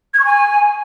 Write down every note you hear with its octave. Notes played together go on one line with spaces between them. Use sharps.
G#6
C#6
G#5